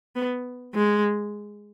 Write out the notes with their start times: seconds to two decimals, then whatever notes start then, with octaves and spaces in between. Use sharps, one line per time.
0.16 B3
0.75 G#3